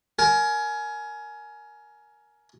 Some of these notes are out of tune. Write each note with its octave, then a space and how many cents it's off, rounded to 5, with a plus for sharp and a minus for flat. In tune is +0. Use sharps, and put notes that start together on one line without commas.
A#4 +0 G#5 +20